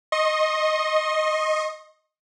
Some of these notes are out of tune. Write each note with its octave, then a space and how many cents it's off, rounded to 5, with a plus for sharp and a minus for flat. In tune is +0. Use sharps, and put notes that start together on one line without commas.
D#5 +0 C6 +45